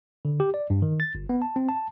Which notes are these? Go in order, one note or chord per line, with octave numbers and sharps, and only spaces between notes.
D3
G4
D5
G2
D#3
A6
G1
B3
A5
C4
A5